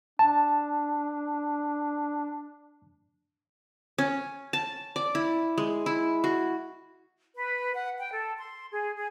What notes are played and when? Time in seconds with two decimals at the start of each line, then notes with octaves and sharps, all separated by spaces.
0.19 D4 A5
3.98 C#4
4.53 A5
4.96 D5
5.15 E4
5.58 G#3
5.86 E4
6.24 F#4
7.36 B4
7.74 F#5
7.99 G5
8.11 A4
8.37 C6
8.72 G#4
8.96 G#4